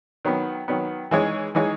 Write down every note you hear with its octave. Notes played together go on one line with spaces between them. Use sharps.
D#3 F#3 B3
D#3 F#3 B3
E3 G#3 D#4 G#4 C#5
E3 G#3 D#4 G#4 C#5